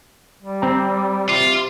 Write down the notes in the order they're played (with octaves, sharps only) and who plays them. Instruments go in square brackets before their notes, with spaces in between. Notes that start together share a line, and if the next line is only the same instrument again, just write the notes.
[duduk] G3
[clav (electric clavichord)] C4 A#5
[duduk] C3 [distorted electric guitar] F4